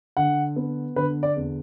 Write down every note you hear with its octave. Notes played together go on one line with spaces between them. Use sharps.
D3 F#5
B3
D3 B4
D5
E2